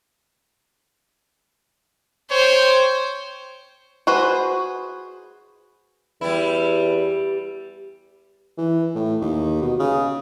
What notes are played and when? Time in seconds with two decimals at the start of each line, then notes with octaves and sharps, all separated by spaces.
2.31 C5 C#5 G5
4.07 F#4 G#4 B4 C5
6.21 E2 G3 E4
8.58 E3
8.95 A2
9.21 D#2
9.62 B2
9.79 C#3